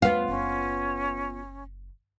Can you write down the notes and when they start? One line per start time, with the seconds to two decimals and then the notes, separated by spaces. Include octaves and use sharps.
0.02 E2 A3 B3 F4
0.28 F#1 C#4